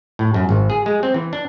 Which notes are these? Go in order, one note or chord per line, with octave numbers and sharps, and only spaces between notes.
A2
F#2
G#1
G#4
G#3
C4
E3
D4